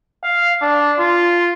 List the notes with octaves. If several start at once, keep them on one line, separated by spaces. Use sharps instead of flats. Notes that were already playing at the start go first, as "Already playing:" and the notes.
F5
D4
F4